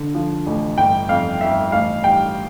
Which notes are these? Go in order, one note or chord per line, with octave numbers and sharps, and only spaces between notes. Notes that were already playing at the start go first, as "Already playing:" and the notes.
Already playing: D3
F3
A1
G1 G5
F2 F5
G1 E5
A1 F5
G3 G5